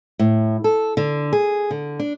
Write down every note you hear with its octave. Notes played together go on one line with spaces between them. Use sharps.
A2
A4
D3
G#4
D3
D4